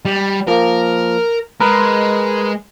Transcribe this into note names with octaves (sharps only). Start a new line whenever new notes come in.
G3
F3 A#3 A#4
G#3 A#4 B4